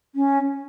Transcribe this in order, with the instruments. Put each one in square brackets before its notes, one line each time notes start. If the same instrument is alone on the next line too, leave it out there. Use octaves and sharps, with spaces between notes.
[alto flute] C#4